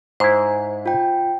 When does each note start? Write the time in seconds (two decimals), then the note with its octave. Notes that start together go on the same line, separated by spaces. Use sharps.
0.20 G#2 E4 C5
0.86 F4 G5